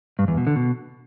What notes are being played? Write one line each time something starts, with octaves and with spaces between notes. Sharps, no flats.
G2
E2
B2
D3
B2